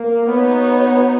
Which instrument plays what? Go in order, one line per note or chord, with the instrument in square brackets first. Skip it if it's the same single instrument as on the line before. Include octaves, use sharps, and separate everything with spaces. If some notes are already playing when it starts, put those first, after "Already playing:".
Already playing: [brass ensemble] A#3
[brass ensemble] B3 [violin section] D#4 F#4 C#5
[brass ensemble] B3